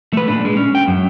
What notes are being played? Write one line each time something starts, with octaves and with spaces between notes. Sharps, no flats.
A3 B4
A#2 D4
G#3
C#4
G5
F#2